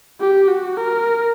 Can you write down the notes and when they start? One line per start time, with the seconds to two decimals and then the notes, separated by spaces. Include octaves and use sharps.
0.20 G4
0.48 F#4
0.77 A#4